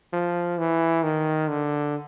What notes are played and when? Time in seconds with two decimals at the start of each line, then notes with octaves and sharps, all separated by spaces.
0.13 F3
0.58 E3
1.03 D#3
1.49 D3